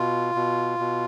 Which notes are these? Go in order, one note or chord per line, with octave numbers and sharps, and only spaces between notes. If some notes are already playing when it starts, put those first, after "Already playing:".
Already playing: B2 F4
B2
B2